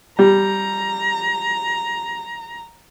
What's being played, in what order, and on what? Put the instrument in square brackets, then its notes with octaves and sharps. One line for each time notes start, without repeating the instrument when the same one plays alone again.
[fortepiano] G3 [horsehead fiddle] A#5